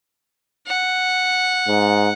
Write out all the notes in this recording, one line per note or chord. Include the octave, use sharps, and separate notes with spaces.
F#5
G#2